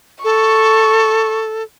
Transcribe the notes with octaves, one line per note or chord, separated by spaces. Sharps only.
A4 C#6